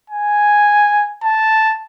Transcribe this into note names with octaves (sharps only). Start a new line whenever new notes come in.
G#5
A5